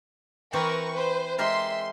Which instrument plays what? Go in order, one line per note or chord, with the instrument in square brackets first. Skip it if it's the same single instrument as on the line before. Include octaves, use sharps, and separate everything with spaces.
[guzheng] E3 C4 G4 [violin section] A#4 B4 C#6
[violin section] B4 C5
[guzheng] G#3 G4 A#4 [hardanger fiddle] E5 [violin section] C6